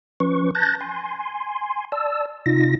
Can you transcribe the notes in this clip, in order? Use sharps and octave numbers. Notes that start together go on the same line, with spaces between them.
F3 C#4 B4 C#6
A5 F#6 G6 A6 A#6
G#5 C6
D5 A5 E6
C3 D#4 F4 A#6